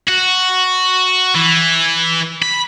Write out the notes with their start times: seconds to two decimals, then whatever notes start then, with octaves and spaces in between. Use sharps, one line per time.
0.08 F#4
1.35 E3
2.42 B5